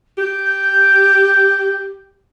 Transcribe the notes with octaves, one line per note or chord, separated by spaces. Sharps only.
G4 G6